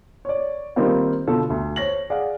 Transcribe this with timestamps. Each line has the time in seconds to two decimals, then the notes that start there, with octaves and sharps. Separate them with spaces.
0.25 C#5 D5
0.76 D#3 G3 A#3 C4 D#4 F4
1.27 B2 D3 F4 A4
1.50 D2
1.76 C5 C#5 A#6 F#7
2.10 G#4 D5 F5 F#5